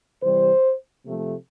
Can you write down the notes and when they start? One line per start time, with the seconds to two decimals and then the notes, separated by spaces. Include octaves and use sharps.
0.22 C3 E3 G3 C5
1.05 C3 F3 A3